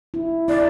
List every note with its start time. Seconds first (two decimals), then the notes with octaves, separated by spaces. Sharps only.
0.14 E4
0.48 E4 D5